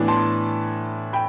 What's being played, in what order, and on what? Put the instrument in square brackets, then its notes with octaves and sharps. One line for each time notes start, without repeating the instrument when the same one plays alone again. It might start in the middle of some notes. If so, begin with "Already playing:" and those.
Already playing: [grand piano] A2 E3 B3 D4
A5 C6
G5 B5